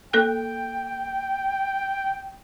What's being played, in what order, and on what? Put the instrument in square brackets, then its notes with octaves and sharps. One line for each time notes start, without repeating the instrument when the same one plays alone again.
[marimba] A#3 A4 F#6 [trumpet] G5